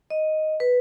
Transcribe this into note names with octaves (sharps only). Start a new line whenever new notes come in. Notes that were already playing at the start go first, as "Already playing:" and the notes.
D#5
B4